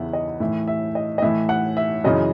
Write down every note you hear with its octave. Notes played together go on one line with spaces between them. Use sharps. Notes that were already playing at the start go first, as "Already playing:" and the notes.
Already playing: E2 C#3 E3 E5 F#5
D#5
A2 E3 E5
E5
D#5
D#5
A2 E3 E5
F#5
E5
F#2 C#3 E3 D#5